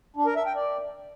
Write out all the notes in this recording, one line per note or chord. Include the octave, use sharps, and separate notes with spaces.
D4
A#4
E5
G5
D5